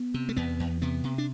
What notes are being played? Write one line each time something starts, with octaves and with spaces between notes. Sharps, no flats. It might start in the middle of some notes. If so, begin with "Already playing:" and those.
Already playing: B3
C3
A3
E2 B3
E2
C3 B3
C3
D4